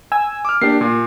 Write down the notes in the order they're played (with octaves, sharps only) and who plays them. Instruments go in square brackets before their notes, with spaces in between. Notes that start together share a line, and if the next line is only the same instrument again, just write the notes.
[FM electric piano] G#5 E6
[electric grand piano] D6 F6
[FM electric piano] A#3 [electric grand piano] D4 G4 C7
[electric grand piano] A#2